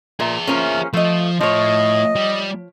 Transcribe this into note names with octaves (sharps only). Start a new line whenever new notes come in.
A#2 G#4 E5
F3 A#3 C#4
F3 A3 D#5
A2 F3 C#5 D#5
G3